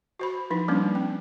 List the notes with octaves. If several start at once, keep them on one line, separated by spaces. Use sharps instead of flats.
F#4 C5 B5
F3 D#4 E4
G3 A#3 C#4 D4
C4